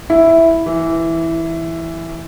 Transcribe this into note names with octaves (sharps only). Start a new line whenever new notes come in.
E4
E3